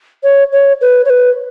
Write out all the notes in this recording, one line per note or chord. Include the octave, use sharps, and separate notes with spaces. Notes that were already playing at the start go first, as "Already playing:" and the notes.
C#5
C#5
B4
C#5
B4